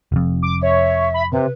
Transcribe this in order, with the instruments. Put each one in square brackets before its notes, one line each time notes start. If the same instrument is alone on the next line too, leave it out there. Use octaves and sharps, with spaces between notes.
[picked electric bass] F1 F2
[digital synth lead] D6
[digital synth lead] C#5 [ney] E5
[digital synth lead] B5
[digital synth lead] C3 [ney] B4